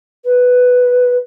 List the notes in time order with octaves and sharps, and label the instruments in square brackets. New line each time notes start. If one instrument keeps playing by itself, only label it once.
[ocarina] B4